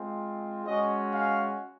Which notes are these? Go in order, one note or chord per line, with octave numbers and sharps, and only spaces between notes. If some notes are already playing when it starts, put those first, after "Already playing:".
Already playing: G#3 C4 F4
G#3 C#4 F#4 D#5
F5